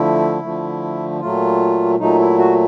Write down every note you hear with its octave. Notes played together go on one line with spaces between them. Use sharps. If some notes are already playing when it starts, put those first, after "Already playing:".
Already playing: D3 F3 A3 E4
D3 F3 A3
A#2 F#3 A3 F4
A#2 F#3 A3 D#4
E4
F#4